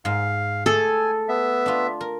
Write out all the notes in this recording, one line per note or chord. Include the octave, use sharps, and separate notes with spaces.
G#2 F5
A3 G#4 A4 G#5
B3 E5
D4 F4
A#4